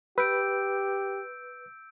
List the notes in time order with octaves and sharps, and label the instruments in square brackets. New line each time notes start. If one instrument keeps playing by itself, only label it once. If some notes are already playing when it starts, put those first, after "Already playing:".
[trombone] G4 [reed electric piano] B4 [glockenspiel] E6 G6 D7